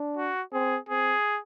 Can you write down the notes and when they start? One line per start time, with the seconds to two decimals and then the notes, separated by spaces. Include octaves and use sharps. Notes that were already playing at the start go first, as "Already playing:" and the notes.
Already playing: D4
0.17 F#4
0.53 C4 G#4
0.89 C4 G#4